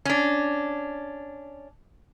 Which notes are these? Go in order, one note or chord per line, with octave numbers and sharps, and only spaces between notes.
C#4 D4